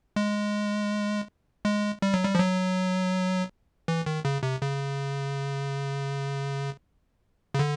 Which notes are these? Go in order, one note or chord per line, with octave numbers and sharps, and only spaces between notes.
G#3
G#3
G3
F#3
G3
F3
F#3
E3
D#3
C#3
C3
C#3
C#3
D3